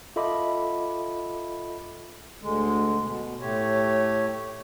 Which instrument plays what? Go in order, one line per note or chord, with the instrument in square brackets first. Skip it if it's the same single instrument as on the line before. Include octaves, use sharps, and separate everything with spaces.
[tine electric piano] F4 A4 D#5 E5 B5 D6
[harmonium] D2 D3 G#3
B2
A2 A3 G4 C#5